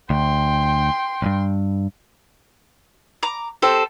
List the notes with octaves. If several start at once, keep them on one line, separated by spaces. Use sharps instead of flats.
D2 G5 C6
B1 G2
A#5 D6
C4 G4 A4 C5